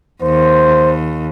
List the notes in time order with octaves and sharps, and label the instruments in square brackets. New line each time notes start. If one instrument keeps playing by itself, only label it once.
[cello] D#2 [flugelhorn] C5